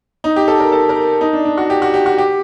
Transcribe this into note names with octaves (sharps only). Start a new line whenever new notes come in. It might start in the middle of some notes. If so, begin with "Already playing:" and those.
D#4
G4
A4
A#4
A4
A#4
D#4
D4
D4
F#4
G4
F#4
G4
F#4
G4